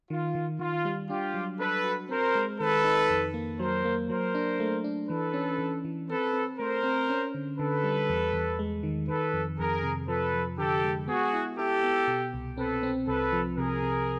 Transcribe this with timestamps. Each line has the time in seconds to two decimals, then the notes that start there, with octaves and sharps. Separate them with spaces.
0.10 D#3 F4
0.35 D#3
0.59 D#3 F4
0.85 G3
1.09 D4 F4 G4
1.34 F#3
1.59 D4 A4 B4
1.84 F#4
2.09 C4 A#4 C5
2.35 G#3
2.60 D#3 A4 B4
2.84 D#4
3.10 F2
3.34 A#3
3.59 F#3 A#4 C5
3.85 A#3
4.09 F#3 A#4 C5
4.35 D4
4.60 A3
4.84 D4
5.09 E3 A4 B4
5.34 C#4
5.59 E3
5.85 E3
6.09 C4 A4 B4
6.33 C4
6.58 A3 A#4 C5
6.83 C4
7.09 C#4
7.34 D3
7.58 D3 A4 B4
7.84 G3
8.09 E2
8.33 E2
8.59 G#3
8.83 D#3
9.08 D#3 A4 B4
9.34 F2
9.58 F2 G#4 A#4
9.83 C3
10.08 F3 A4 B4
10.34 F3
10.58 D3 G4 A4
10.84 G#3
11.08 B3 F#4 G#4
11.33 E4
11.58 E4 G4 A4
11.83 B3
12.07 B2
12.34 C2
12.57 C4 A4 B4
12.83 C4
13.07 C2 A4 B4
13.32 F3
13.57 C3 G#4 A#4
13.83 C3